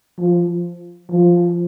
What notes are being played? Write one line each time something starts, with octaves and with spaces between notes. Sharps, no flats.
F3
F3